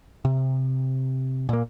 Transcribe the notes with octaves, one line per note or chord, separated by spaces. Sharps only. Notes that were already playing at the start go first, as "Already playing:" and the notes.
C3
A#2 A#3